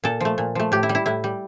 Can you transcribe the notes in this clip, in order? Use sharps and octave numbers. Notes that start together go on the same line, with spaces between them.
A#2 A4
F3 A3
A#2
F3 A3
A2 G4
E4
G3
E4
A2 E4
G3